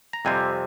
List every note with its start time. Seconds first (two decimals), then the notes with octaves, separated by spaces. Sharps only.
0.13 A#5
0.25 F2 C3 G3 C4 G#5